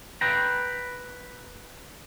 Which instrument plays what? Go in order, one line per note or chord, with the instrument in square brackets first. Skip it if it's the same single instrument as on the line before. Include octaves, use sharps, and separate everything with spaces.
[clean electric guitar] B4 G5 A#5